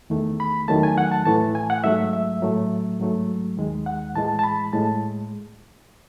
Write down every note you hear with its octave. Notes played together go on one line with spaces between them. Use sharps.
E2 D#3 A3
B5
E2 D#3 F#3 A3 A5
G#5
F#5
A5
A2 E3 A3 A5
G#5
F#5
G#2 F#3 A3 E5
E5
A2 F#3 A3
G#2 F#3 A3
D#2 D#3 G#3
F#5
A2 E3 G#3 A5
A5
B5
A2 G#3 A5